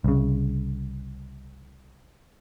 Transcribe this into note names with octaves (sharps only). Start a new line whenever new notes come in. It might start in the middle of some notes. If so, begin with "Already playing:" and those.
C2 C#3